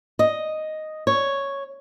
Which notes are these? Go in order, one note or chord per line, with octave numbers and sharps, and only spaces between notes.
D#5
C#5